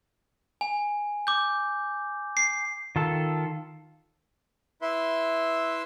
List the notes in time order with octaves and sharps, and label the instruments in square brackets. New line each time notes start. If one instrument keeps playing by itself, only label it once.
[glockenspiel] G#5
D6 G6
C7
[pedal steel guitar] D#3 F4 A4
[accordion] E4 B4 E5 C6